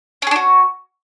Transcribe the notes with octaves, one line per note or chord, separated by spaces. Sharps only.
C#4 D4 F#4 G#4